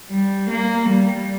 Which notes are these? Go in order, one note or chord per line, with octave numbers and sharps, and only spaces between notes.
G3
A#3
G3